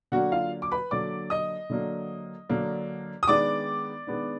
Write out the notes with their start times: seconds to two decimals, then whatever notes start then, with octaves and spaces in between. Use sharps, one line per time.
0.12 D3 F#3 A#3 D4 F#4 F#5
0.32 F4 F5
0.62 D6
0.72 B4 B5
0.91 D3 F#3 A#3 D4 D5 D6
1.30 D#5 D#6
1.70 D3 F#3 A#3 D4
2.49 D3 F#3 A#3 D4
3.23 D#6
3.28 D#3 G#3 B3 D4 D5 D6
4.07 D#3 G#3 B3 D4